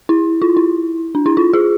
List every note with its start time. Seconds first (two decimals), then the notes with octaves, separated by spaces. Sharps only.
0.09 E4
0.42 F4
0.57 E4
1.15 D4
1.26 E4
1.37 F4
1.53 G#4